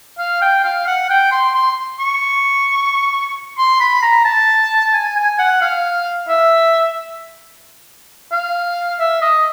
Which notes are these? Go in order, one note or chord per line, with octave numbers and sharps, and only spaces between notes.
F5
G5
F5
F#5
G5
C6
C6
C#6
C6
B5
A#5
A5
G#5
G#5
F#5
F5
E5
F5
E5
D#5